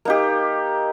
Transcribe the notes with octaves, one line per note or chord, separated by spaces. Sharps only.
A#3 D#4 G4